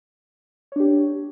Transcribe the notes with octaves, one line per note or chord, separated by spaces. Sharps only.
D4 G4 C#5